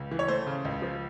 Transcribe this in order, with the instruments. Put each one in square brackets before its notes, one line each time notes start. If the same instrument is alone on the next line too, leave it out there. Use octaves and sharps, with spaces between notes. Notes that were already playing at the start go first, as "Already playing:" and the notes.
Already playing: [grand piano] C#2
E3
C#5
A3 C5
C#3
C#2
F3